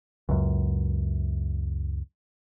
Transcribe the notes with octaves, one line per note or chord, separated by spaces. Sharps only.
C#2 F#2